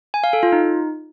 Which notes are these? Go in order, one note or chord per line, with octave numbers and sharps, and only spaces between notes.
G#5
F5
A4
F4
D#4